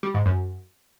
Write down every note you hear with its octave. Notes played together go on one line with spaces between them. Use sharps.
G3
G#2
F#2